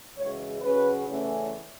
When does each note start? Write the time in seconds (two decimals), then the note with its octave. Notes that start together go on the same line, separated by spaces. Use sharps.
0.18 F#2 C#3 E3 G#3 C#5
0.62 F#2 C#3 F#3 C#4 B4
1.07 E2 C#3 E3 A3 C#4